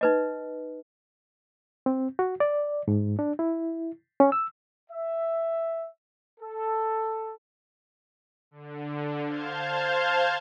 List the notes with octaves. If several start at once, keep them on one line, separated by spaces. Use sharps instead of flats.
D#4 B4 D#5
C4
F#4
D5
G#2
D4
E4
C#4
E6
E5
A4
D3
C5 F5 A5 F6 G6 G#6